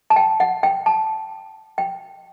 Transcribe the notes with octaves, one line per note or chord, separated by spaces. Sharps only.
A5
G5
F#5
G5
A5
G5